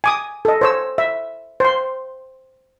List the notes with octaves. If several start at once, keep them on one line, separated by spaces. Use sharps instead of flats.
G#5 D6 D#6
A4 D#5
C5 C#5 E6
E5
C5 C6